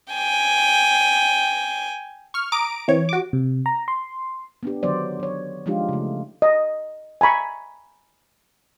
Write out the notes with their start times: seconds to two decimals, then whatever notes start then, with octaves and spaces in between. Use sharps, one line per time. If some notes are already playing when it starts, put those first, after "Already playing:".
0.13 G5 G#5
2.34 C#6 F6
2.52 A#5 D6 D#6 D7
2.88 E3 C4 C#5
3.09 F#4 D6
3.33 C3
3.66 A#5
3.88 C6
4.63 B3 D4 G4
4.83 D3 D#3 F#3 B3 C5 D5
5.20 F#3 C#5
5.66 F3 G#3 D4 D#4 F4 G4
5.89 C#3 A3
6.42 D#5
7.21 G#5 A#5 B5 C#6